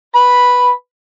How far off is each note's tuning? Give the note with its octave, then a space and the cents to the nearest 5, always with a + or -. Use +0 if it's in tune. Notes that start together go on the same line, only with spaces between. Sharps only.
B4 -5 B5 +0